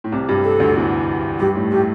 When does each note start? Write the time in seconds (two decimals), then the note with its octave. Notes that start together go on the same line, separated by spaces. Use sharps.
0.04 A2
0.12 C2 C3
0.29 G2 G3
0.44 A4
0.60 D2 D3
0.76 E2 E3
1.40 G2 G3 G4
1.55 A2 A3
1.72 A2 A3 G4